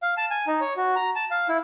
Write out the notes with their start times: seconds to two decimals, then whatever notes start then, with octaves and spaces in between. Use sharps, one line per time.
0.02 F5
0.17 A5
0.31 G#5
0.47 D#4
0.61 C#5
0.77 F#4
0.96 A#5
1.15 A5
1.31 F5
1.49 E4